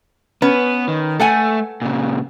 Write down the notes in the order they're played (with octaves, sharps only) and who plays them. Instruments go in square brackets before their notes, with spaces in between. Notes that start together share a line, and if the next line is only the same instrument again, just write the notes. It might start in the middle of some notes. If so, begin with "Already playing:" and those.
[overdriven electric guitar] B3 [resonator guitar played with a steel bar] C#4 B4
[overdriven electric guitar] D#3
[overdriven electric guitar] A3 [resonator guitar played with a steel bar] A4 F#5 G#5
[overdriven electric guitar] A#2 C#3